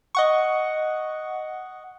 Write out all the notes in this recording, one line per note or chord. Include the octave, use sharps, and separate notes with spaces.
D#5 F#5 C#6